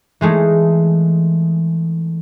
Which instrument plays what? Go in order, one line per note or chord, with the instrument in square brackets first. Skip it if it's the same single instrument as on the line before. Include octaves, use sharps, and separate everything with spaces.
[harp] E3 G#3 A3 D#4